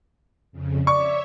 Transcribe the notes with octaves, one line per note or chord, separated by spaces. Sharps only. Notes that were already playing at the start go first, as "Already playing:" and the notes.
F2 C#3
C#5 D5 E5 C#6